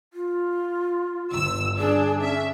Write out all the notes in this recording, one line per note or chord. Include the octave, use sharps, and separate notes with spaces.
F4
G1 E6
D4 G#4
C#4 E5